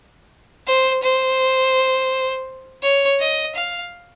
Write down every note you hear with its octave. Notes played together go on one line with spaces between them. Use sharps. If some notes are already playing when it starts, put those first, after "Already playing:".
C5
C5
C#5
D#5
F5